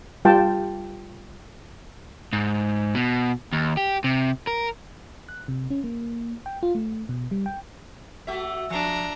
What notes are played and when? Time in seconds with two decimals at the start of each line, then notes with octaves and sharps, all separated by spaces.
0.25 G3 F4 G5 A5
2.33 G#2
2.95 B2
3.53 D#2
3.77 G4
4.04 C3
4.47 A#4
5.29 F#6
5.48 C3
5.70 C#4
5.84 A#3
6.46 G5
6.63 F4
6.75 A3
7.09 B2
7.31 G3
7.46 G5
8.27 A3 F#4 E5
8.70 F3 D4 A#5